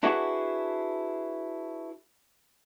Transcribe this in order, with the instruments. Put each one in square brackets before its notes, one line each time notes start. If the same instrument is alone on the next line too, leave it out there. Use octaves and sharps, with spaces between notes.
[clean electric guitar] D4 E4 F#4 G#4 B4 F#5